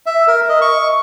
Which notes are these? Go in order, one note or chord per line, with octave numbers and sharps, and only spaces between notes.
E5
A#4
D#5
C#6